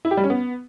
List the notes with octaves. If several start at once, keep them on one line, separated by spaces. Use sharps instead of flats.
E4
G4
G3
C#4
B3